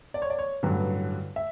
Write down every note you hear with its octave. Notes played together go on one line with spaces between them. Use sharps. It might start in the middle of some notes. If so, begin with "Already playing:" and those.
D5
C#5
D5
C#5
A1 G2 D3 F#3 B4
E5